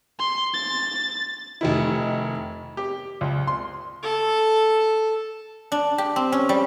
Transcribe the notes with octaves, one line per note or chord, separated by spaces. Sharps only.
C6
A6
F1 D#3 E4
G4
C#2
C6
A4
D4
G4
C4
C#4
G3